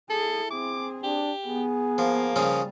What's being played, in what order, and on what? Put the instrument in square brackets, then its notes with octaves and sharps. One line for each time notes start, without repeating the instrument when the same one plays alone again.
[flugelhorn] E4 [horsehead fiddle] G#4 [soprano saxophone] A4
[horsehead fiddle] C4 G#4 [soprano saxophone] D6
[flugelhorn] D4 [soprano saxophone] G4
[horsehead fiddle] B3 [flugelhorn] G#4
[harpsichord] F3 [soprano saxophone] A#3
[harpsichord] C#3 F3 C#4 [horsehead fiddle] G3